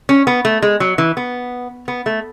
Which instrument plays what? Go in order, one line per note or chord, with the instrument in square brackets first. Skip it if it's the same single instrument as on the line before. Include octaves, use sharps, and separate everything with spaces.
[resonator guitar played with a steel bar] C#4
B3
A3
G#3
F#3
E3
B3
B3
A3